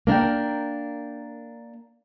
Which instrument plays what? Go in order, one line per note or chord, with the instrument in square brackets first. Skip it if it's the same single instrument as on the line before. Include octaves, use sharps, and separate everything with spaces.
[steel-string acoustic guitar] A#3 D4 A#4 G5